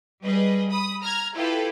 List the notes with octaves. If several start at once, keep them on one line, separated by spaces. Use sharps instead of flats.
G3 G#4 B4 D#5
B5 D#6
A#5 F6 G#6
E4 F4 G4 A4 B4